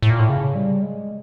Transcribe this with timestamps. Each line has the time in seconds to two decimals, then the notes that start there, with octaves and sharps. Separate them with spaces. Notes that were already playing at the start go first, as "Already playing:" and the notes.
0.02 A2
0.10 A#2
0.19 A2
0.29 C#3
0.55 G3
0.82 G#3